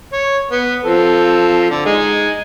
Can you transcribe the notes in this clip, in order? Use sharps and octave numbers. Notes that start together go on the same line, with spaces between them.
C#5
B3
F3 C4 A4
D3
G#3 D#4 G#5